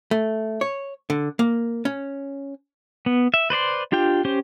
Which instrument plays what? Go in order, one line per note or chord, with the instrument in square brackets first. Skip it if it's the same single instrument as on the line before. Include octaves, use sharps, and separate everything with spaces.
[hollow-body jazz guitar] A3
C#5
D3
A#3
C#4
[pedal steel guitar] B3
E5
B4 C5 D5 C6
D4 F4 G4 G5
C#4 G4 C5